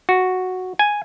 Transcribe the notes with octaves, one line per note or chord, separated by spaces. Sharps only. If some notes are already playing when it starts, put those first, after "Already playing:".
F#4
G#5